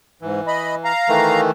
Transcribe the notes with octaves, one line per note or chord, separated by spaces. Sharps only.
G#2 E3
D#5 B5
F5 A#5
D#3 E3 A3